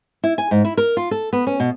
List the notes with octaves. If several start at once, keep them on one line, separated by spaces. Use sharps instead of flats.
E4
G#5
G#2
E4
A#4
F4
A4
B3
C#4
B2